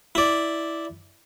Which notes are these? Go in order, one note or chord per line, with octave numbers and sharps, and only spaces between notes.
E4 D5